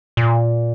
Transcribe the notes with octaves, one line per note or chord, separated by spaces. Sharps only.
A#2